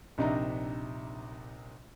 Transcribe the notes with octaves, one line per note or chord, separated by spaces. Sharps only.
A#1 C3 D4 D#4 E5 A#5